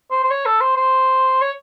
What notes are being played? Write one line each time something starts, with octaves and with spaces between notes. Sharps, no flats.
C5
C5
C#5
A4
C5
C5
C#5